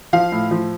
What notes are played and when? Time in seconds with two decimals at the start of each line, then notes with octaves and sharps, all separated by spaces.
0.13 F3 F5
0.32 A2
0.51 F3